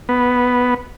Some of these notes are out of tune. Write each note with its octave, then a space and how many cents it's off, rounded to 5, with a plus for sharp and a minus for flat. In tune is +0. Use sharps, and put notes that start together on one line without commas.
B3 +0